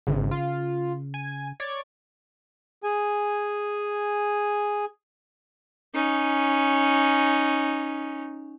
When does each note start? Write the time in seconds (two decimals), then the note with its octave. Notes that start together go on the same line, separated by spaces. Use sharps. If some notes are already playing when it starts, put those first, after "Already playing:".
0.07 G#1 C#3
0.31 F4
1.14 G#5
1.60 C#5 D5 G#6
2.84 G#4 G#5
5.94 C#4 D#4